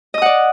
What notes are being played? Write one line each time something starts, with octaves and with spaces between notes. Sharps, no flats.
D5 D#5 F#5 D#6